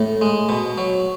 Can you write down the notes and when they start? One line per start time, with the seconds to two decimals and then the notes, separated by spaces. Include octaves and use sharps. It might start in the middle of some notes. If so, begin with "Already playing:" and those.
Already playing: A2
0.21 G#3
0.49 B2
0.78 F#3